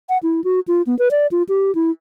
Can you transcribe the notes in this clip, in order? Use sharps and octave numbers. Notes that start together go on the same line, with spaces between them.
F#5
E4
F#4
F4
B3
B4
D5
F4
G4
E4